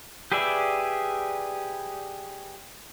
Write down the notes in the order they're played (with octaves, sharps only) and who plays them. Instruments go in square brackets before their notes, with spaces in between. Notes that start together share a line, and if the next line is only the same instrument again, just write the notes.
[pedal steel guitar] G4 G#4 B4 D5 E5